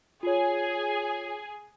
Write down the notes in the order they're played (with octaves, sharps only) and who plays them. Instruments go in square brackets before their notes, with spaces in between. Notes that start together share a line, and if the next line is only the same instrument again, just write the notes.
[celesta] F4 C#5 [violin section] G#4 G#5